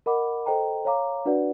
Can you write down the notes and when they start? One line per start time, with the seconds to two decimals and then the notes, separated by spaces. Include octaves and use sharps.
0.06 A#4 D#5 F#5 B5 D6
0.46 A4 C5 D#5 G5 A#5
0.85 C#5 F5 A#5 D6
1.25 D4 F#4 B4 D5 F#5